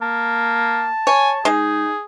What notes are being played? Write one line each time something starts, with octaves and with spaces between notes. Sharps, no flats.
A#3 A5
C#5 G#5
G#3 D#4 G#4